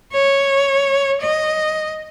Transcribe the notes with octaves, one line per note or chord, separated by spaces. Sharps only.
C#5
D#5